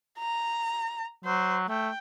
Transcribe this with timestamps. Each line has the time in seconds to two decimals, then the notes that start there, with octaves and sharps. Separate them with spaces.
0.19 A#5
1.25 F#3 C5
1.69 A3 G5